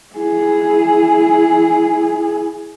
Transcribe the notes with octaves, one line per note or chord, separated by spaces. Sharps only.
E4 G#4